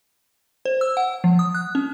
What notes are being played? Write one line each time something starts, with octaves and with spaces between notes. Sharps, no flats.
C5
E6
F#5
F3
D#6
F#6
C#4